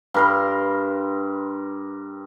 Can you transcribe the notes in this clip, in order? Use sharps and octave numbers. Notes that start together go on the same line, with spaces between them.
G2 A#4 C6